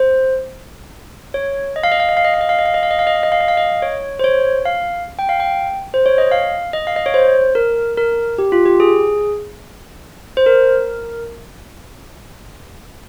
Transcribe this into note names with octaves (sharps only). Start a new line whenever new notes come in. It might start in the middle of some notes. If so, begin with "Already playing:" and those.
Already playing: C5
C#5
D#5
F5
D#5
F5
D#5
F5
D#5
F5
D#5
F5
D#5
F5
D#5
F5
D#5
F5
D#5
F5
D#5
F5
D#5
F5
D#5
C#5
C5
C#5
F5
G5
F5
G5
C5
C#5
D#5
F5
D#5
F5
D#5
C#5
C5
A#4
A#4
G4
F4
G4
G#4
C5
A#4